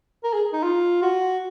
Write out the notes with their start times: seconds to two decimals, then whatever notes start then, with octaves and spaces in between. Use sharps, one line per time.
0.24 A#4
0.33 G#4
0.53 D#4
0.63 F4
1.02 F#4